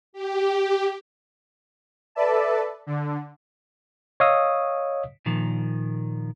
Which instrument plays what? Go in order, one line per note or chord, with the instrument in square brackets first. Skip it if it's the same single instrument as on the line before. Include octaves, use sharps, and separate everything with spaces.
[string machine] G4
[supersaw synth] A4 B4 D5 E5 A5
D3
[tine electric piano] C#5 D#5 F5 D#6 E6
[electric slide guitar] A#2 D#3 F3